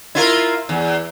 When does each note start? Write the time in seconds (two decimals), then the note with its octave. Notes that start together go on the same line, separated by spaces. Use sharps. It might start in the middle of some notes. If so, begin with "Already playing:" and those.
0.15 E4 F4 A#4
0.69 E2